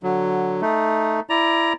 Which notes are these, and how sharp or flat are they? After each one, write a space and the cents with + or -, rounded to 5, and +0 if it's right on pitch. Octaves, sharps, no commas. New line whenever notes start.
D3 +5 F#3 +0
A3 +0 D#4 +5
E4 +15 D5 +5 A#5 +10